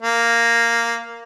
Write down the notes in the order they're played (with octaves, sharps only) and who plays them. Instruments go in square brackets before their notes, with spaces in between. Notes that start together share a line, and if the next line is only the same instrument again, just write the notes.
[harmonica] A#3